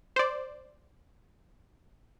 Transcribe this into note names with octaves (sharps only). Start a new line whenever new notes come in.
C5 D5